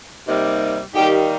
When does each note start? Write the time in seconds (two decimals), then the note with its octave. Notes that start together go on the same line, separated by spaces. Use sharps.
0.28 C3 G3 A#3 D#4
0.94 D#3 G3 A#3 D#4 G4